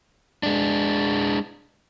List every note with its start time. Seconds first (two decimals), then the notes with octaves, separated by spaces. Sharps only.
0.43 G#3 D4